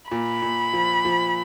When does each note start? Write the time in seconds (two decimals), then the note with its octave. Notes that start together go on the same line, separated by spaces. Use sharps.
0.11 A#2 B5
0.42 A#2
0.73 F3
1.05 F3